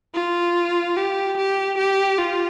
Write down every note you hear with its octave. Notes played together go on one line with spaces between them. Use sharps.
F4
G4
G4
G4
F4